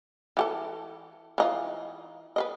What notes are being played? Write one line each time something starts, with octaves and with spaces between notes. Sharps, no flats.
E3 G4 A4
E3 D#4 F4
B4 C5 D#5